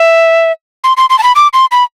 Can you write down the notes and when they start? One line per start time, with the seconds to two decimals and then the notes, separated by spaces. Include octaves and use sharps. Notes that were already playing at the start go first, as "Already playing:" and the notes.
Already playing: E5
0.84 C6
0.97 C6
1.10 C6
1.19 A5
1.23 B5
1.36 D6
1.53 C6
1.72 B5